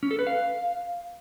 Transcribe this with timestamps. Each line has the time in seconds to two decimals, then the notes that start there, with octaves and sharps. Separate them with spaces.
0.03 C#4
0.11 A4
0.19 B4
0.27 F5